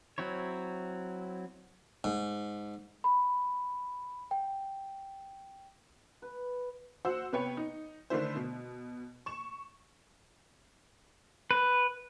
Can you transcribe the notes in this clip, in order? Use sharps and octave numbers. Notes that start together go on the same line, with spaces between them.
F#3 C4 E4 C#5
G#2
B5
G5
B4
F#4 C5 F#5 E6
C3 B3 B4 C#5 G5 C#7
D#4
D3 D#3 A3 D4 E4 C5
B2
C#6 E7
B4